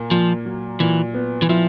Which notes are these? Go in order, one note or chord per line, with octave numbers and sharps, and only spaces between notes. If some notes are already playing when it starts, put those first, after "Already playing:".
Already playing: A#2 A#3
A#2 F3
F#3
A#2 E3
B3
E3
F3 E4